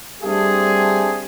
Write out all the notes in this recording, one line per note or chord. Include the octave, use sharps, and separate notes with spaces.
G3 A3 C4 D4 G4 G#4